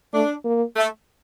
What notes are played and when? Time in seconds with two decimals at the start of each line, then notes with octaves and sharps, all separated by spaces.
0.14 A3 D4
0.45 A#3
0.76 A3